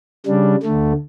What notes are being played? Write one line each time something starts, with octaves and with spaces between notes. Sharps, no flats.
C#3 G3 D4
D2 D3 A3